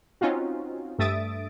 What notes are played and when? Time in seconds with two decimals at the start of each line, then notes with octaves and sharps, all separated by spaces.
0.21 C4 C#4 D#4 F4 F#4
0.99 G2 A3 E5 D#6 A6 D7